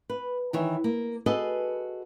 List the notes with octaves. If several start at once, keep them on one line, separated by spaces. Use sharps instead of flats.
B4
D#3 E3 C#5
A#3
F#4 G#4 A4 B4 D#5